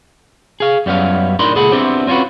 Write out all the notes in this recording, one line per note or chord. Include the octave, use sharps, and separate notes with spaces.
G#4 F5
F#2 G3 B3 C#4 F5
A2 D4 D#4 A#4 B5 C6
C#2 A#2 G#4 A4 F#5 B5
B3 C4 D4 E4 G4 C5
C4 C#4 F4 F#4 B4